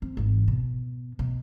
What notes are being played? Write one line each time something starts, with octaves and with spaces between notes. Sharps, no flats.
C4
G#1 E3
B2
B2